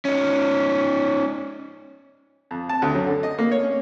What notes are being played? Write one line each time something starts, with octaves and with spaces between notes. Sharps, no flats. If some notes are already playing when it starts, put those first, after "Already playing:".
C#4 D#4
F2
A5
D2
F#2
D3
D#5
A#3
C#5
C#4